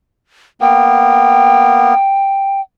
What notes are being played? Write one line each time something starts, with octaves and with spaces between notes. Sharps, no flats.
A#3 B3 G5